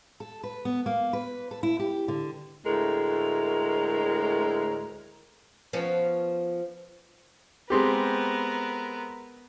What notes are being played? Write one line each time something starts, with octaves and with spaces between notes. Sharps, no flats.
A4
B4
B3
A#3
B4
A4
E4
G4
D3
D2 A2 G#3 A#4
F3 B3 C#4
G#3 B3 C4 G4 A#4